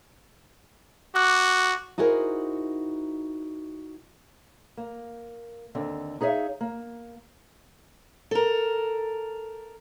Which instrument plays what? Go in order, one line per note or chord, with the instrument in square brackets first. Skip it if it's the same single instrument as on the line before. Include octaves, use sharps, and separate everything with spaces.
[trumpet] F#4 [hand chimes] D6 F#6
[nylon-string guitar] D#4 E4 F#4 G#4 A#4 C5
[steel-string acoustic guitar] A#3
D#2 D3 C4
D#4 G#4 C#5 E5 F5
A#3
A4 A#4